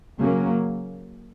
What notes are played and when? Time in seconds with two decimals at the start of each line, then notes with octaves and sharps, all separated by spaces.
0.18 C#3 F#3 A#3 C#4